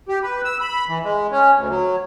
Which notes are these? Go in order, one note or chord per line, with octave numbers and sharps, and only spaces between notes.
G4
B4
E6
B5
E3
G#3
C#4
D2
F#3